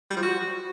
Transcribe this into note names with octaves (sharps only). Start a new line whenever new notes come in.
G3
F3
F#4